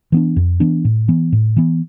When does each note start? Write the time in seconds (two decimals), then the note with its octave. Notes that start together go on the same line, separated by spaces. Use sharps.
0.12 E3 B3 D4
0.36 F2
0.60 E3 B3 D4
0.85 A2
1.08 E3 B3
1.32 A2
1.56 E3 B3